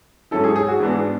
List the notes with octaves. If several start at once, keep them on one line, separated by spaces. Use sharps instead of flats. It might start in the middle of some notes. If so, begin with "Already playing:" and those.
G#2 F#3 C#4 E4 A4
G#4
G#4
F#4
G#2 E3 B3 D4